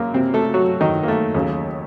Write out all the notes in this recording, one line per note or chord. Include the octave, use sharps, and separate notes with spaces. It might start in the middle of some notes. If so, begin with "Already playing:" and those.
Already playing: F#2 C#3 F#3 A#3
C3 C4
A3 A4
F#3 F#4
D#3 D#4
A#3
A3
D#2 C#3 F#3